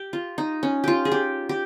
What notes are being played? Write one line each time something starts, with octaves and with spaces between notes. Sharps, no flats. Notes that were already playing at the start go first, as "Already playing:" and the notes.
Already playing: G4
F4
D#4
C#4
F4 G4
G#4
G4
G4